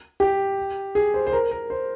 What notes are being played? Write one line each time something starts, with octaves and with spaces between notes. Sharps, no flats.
G4
G#4
C5
C5
A#4
A#4
C5